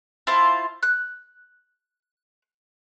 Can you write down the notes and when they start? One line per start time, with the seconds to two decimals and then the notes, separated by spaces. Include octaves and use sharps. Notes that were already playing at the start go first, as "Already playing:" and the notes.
0.27 E4 F4 C5 A5
0.83 F#6